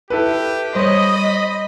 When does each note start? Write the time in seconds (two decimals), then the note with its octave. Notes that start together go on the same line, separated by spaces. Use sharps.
0.10 E4 G4 A4 B4
0.75 G3 C5 C#5 D#5 B5